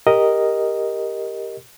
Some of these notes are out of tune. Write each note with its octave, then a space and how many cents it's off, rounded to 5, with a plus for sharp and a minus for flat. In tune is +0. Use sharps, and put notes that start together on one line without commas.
G4 +10 A#4 +0 D#5 +0